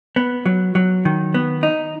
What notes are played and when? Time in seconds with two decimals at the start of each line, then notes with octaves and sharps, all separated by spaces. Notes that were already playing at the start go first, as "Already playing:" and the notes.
0.16 B3
0.46 F#3
0.75 F#3
1.05 D#3
1.34 B3
1.63 D#4